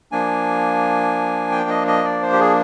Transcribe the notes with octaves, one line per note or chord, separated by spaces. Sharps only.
F3 A#3 D4 G#5
G5
D#5
D#5
D5
C5
G4
G#4